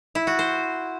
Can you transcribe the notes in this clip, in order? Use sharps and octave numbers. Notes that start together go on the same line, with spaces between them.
E4
F#4
C5